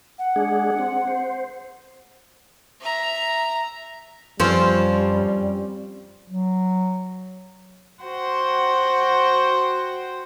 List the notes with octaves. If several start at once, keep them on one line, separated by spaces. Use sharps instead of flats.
F#5
G#3 D4 G#4
C4
C5
E5 A#5
F#2 F3 G3 C4 C#4 F4 B4 C5
F#3
F#4 C5 F#5 G5